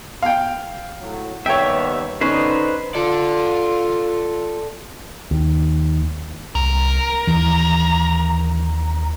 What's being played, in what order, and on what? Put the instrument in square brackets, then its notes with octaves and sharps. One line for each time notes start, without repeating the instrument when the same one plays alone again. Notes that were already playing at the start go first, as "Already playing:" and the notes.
[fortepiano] F5 G5
[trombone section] A2 F#3
[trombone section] D#2 G3 B3 [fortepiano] C#5 G5 [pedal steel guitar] E5
[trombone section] D3 D#4 [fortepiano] C#4 [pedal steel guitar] B4 C5
[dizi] F4 [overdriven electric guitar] A4 D5
[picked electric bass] D#2
[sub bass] C2 [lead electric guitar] A#4
[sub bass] D#2 [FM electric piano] E3